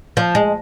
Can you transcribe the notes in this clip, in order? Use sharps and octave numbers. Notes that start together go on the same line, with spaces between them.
F3
G#3